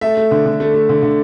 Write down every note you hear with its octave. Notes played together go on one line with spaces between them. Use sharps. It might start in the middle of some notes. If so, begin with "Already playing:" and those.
A3 E5
A3
D3
D3
A3
A3
D3
D3